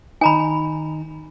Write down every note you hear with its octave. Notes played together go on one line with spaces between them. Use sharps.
D#3 D#4 G#5 A#5 B5